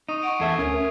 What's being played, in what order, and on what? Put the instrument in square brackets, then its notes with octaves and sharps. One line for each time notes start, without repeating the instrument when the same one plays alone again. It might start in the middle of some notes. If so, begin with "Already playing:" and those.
[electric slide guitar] D#4 [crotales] C#6 D#6 D#7
[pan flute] F#5 [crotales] C#6 D7
[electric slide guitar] E2 A4 E5 [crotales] C#6 G#6 C7
[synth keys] D2 [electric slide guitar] C#4 [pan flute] A#4
[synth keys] A#4 [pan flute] E5